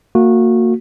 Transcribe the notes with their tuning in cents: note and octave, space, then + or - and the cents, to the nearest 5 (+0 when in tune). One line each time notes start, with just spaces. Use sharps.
A#3 -30 F#4 -20